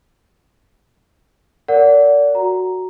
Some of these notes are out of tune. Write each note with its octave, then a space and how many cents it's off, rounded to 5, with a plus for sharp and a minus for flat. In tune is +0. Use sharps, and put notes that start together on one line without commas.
A#4 -20 D5 -30 F#5 +0
F#4 +0 A#5 +0